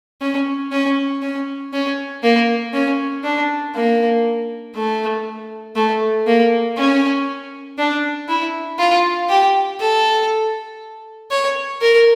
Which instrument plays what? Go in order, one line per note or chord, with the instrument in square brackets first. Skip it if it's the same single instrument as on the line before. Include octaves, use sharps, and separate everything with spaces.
[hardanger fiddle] C#4
C#4
C#4
C#4
A#3
C#4
D4
A#3
A3
A3
A#3
C#4
D4
E4
F4
G4
A4
C#5
A#4